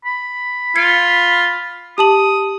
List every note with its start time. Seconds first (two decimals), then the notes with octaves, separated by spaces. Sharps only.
0.05 B5
0.76 F4 G#6 C7 C#7
1.98 G4 A5 D#6 F#7